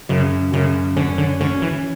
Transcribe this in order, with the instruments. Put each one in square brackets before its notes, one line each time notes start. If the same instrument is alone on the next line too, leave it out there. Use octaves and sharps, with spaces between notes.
[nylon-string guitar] F#2 [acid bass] C#3
[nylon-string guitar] F#2 [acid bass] C#3
[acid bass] D3 [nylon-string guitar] C#4
[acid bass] D3
[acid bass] D3 [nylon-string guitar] C#4
[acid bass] E3